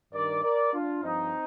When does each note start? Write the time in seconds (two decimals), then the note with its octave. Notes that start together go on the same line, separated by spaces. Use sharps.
0.13 G2 D#3 A#4 D5
0.43 A#4 D5
0.73 D4 F4
1.03 G2 F3 C4 D#4